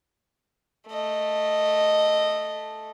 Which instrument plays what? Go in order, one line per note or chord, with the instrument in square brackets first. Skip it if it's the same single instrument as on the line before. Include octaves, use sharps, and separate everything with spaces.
[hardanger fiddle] A3 D#5